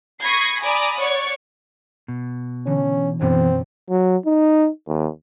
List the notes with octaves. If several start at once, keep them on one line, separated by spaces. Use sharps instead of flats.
B5 C#6 D#6 G#6 A#6 C7
D5 G#5 A#5 B5 D6 D#6
C#5 D5 F#5 C#6
B2
D3 E3 C#4
F#2 B2 D3 E3 B3 C4
F#3
D#4
D#2